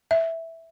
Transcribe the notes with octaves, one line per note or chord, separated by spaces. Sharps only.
E5